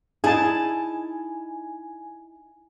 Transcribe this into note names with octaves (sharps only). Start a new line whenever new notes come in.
D#4 E4 G#4 G#5 A5